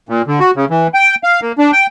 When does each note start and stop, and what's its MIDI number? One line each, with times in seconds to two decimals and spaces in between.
0.09 0.22 46
0.27 0.40 50
0.40 0.51 66
0.56 0.65 49
0.70 0.87 52
0.94 1.15 79
1.24 1.40 77
1.42 1.52 58
1.58 1.71 62
1.73 1.87 79